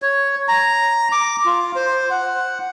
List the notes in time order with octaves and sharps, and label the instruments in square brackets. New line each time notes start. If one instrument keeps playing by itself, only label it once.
[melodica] C#5
A#5
D6
F4
C5
F#5